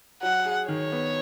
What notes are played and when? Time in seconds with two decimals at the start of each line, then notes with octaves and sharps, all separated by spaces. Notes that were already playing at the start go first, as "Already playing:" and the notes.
0.23 F#3 F#5
0.46 G#4
0.68 D#3 C#5
0.92 B3